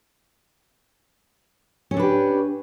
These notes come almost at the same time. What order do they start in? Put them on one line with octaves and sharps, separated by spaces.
C#4 A4 D4 B4 G4